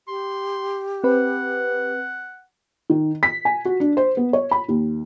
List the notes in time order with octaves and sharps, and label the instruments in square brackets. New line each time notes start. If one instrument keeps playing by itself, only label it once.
[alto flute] G4 [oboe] C6
[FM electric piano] C4 B4 [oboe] F#5
[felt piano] D#3
B6
G#5
F#4
D4
C5
B3
C#5
B5
D#2